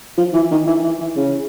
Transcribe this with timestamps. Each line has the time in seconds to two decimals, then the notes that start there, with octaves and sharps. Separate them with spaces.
0.17 F3
0.34 E3
0.51 D#3
0.67 E3
0.83 E3
1.00 E3
1.16 C#3